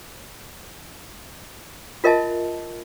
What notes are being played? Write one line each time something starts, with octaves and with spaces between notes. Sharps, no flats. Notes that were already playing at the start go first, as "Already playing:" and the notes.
F4 A#4 D#5 E5 A5